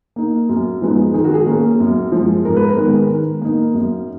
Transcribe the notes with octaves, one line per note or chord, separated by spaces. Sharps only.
A#3 D#4
F#2
F3 G#3 B3 D#4
D#3 G#4
F#4
G#4
A#3 C#4
F#2
F3 G#3
G#2 A#4
B4
A#4
D#3 G#3 B3
D#3
A#3 D#4
F#2